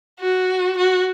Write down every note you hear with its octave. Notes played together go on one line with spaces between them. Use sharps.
F#4
F#4